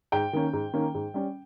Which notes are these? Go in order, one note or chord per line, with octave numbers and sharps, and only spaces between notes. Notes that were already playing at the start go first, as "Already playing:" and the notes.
G#2 G5
D#3 A#3 C#4
G#2
D#3 A#3 C#4
G#2
G3 C#4